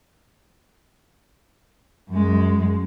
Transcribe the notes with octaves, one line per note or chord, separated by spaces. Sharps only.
F#2 G#3